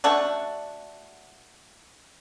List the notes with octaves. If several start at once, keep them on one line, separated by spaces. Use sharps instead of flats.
A3 D4 F#4